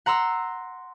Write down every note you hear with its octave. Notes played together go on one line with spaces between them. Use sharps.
F#5 A#5 C6 E6